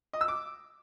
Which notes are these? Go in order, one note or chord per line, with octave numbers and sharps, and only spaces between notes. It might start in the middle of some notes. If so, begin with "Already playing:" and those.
D#5
E6
D6